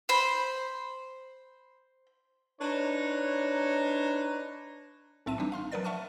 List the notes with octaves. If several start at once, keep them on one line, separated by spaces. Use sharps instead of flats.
C5 B5
D4 D#4 B4 C#5 A#5
B1 A2 C4 E5 A5 D#7
E3 G3 D4 D#4
F5 C6 F6
F3 F#3 A#4 B4 D5 A6
E5 F#5 A5 C#6 F6 D#7